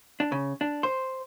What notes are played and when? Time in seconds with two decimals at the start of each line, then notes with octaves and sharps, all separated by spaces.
0.20 D4
0.32 C#3
0.61 D4
0.83 C5